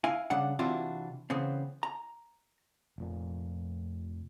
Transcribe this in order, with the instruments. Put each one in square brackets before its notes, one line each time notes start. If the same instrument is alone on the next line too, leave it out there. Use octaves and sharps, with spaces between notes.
[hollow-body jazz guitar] E4 F5 G#5
C#3 G3 D4 F#5
C3 E3 C4 D4 F4 F#4
C#3 E3 B3 C4
A#5
[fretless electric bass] F1 F2 A#2